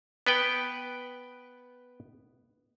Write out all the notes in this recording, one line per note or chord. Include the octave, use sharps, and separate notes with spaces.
B3 B4 G5